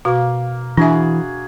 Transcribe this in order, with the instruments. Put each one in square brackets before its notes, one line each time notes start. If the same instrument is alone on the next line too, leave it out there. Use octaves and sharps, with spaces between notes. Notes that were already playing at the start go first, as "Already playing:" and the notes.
[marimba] B2 D6 [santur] A#3 [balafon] F#4
[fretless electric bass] E3 [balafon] D4 E5 [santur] F#4 G#4